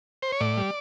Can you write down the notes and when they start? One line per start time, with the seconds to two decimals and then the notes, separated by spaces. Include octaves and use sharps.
0.22 C5
0.32 C#5
0.41 A2 D5
0.57 G3